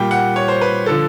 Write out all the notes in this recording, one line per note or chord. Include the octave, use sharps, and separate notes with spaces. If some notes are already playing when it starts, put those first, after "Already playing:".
Already playing: A#2 G3 G5
F#5
C#5
C5
B4
D3 F3 A4